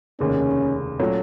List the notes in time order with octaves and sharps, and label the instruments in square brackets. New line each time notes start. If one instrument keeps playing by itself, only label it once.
[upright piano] F1 D#2 C#3 [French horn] C#4
[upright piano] A#2 F#3 A3 C#4